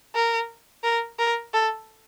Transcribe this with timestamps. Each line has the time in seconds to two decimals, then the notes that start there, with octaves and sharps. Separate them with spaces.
0.15 A#4
0.84 A#4
1.19 A#4
1.54 A4